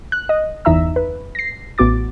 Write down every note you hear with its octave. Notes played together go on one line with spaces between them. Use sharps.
F#6
D#5
G1 E2 D#4 E5 A#5 E6
B4
A#6 C7
A1 B3 F#4 D6 A6